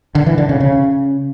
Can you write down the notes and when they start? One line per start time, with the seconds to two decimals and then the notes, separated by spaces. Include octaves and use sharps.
0.15 D3
0.26 E3
0.38 D3
0.49 C#3
0.60 C#3